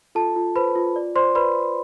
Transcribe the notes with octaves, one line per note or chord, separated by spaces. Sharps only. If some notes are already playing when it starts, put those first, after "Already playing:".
F4 A4 A5
F4
B4 C5 B5
F4
D5
C5 D5 C6
B4 D5 B5